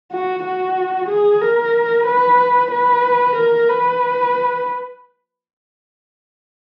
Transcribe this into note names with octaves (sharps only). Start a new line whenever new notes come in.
F#4
F#4
G#4
A#4
B4
B4
A#4
B4